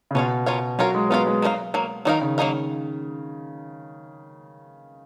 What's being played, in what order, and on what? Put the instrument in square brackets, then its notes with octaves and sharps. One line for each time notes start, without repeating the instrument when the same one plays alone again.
[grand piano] C#3
[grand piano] B2 [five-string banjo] C#4 F4 A#4 C#5 F5
[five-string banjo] C#4 F4 A#4 C#5 F5
[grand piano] F#3 [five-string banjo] C#4 F4 A#4 C#5 F5
[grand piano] G#3
[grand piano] B3 [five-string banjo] C#4 F4 A#4 C#5 F5
[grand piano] G#3
[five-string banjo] F#3 A#3 D#4 A#4 F5
F#3 A#3
[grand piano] D#3 [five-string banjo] F#3 A#3 D#4 A#4 F5
[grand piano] C#3
[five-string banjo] F#3 A#3 D#4 A#4 F5